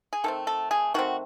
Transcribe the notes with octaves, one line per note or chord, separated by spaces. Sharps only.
G#4
D#3 A3 C4 A4
A4
G#4
D#3 A3 C4 F#4